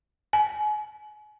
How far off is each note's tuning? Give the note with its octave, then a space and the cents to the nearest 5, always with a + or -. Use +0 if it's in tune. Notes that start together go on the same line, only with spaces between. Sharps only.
G#5 +30